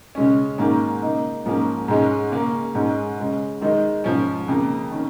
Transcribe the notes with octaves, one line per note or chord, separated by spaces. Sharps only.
C#3 G#3 C#4
G#2 D#3 A#3 C#4
C#3 A#3 D#4
G#2 F3 A#3 C#4
G#2 G#3 C#4
C#3 A#3 C#4
G#2 G#3 C#4
C#3 G#3 C#4
D#3 G#3 D#4
G#2 F3 C#4
F2 C#3 A#3
D#3 C#4